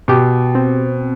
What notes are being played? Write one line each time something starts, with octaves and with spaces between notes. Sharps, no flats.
B2 G4
C4